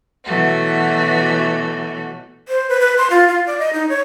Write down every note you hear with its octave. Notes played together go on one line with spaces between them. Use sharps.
B2 E3 F#3 A3 F#4
C5
B4
B4
C6
F4
F4
D5
D#5
D#4
C#5